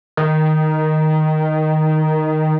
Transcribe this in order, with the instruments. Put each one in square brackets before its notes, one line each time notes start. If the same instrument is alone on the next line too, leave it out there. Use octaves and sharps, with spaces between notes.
[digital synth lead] D#3